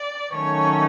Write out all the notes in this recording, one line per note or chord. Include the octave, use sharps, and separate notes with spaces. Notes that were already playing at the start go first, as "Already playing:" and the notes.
Already playing: D5
D#3 F#3 A3 C#4 C#5